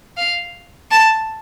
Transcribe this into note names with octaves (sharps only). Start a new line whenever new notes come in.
F5
A5